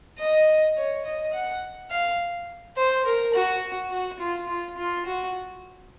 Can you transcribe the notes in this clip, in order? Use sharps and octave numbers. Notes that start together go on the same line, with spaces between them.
D#5
C#5
D#5
F#5
F5
C5
A#4
F#4
F#4
F4
F4
F4
F#4